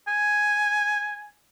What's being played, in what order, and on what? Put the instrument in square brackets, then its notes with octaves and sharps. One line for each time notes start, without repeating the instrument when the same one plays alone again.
[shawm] G#5